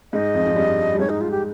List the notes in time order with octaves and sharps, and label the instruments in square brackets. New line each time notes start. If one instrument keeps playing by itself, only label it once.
[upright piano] G#2 G#3 [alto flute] D#5
[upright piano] F2 F3
F2 F3
G2 G3
G3
[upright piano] G#2 G#3 [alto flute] C#5
[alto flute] D#4
F4
G4